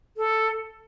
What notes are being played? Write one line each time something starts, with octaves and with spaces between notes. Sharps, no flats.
A4